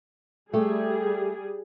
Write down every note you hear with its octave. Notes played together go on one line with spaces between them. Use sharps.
G3 A3 G4 G#4